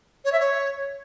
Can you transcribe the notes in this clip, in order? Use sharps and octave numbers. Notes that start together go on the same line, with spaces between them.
C#5
E5
C#5